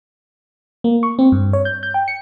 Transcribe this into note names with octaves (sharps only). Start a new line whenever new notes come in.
A#3
C#6
C4
G2
C#5
G6
G6
G5
C#7